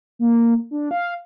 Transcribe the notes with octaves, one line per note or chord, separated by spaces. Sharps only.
A#3
D4
F5